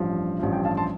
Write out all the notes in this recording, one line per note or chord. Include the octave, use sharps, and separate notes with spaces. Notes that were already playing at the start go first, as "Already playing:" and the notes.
Already playing: A1 G2 F3
A1 G2 F3
G5
F5 A5
A5 C6